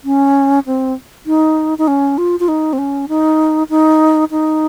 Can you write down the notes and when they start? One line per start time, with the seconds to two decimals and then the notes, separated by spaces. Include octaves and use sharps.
0.05 C#4
0.66 C4
1.26 D#4
1.78 D#4
1.88 C#4
2.18 F4
2.40 F4
2.48 D#4
2.73 C4
2.78 C#4
3.09 D#4
3.70 D#4
4.31 D#4